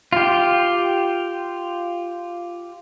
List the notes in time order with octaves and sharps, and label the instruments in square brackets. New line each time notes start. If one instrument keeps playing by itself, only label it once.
[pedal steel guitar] F4 G4